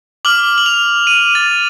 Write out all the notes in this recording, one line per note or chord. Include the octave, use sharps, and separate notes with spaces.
D6 F6 F#7
F#7
F7
D#7
A6